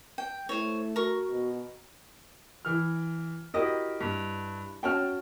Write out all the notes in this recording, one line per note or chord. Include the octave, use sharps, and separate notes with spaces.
G5
A3 E4 C5 C#5
F#4 A#4 C#6
B2
E3 F6
E4 F#4 G4 A#4 D#5
G2
C#4 F#4 C#5 G5 A5 F6